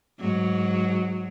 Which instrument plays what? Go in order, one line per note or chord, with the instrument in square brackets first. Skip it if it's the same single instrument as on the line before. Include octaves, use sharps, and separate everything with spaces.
[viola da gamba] G#2 F#3